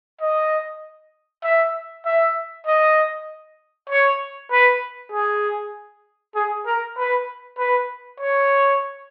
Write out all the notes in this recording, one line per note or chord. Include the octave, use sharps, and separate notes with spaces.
D#5
E5
E5
D#5
C#5
B4
G#4
G#4
A#4
B4
B4
C#5